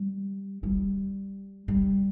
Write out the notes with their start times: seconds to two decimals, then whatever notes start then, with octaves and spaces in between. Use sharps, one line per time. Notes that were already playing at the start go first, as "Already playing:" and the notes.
Already playing: G3
0.63 G3
1.68 G3